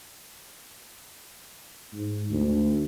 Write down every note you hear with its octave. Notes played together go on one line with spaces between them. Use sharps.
G#2
D2